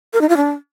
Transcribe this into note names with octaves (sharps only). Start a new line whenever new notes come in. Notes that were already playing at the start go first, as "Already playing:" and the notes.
A#4
D#4
F4
D4